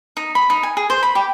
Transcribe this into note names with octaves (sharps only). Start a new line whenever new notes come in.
D#4
B5
D#4
G#5
G#4
C5
B5
G4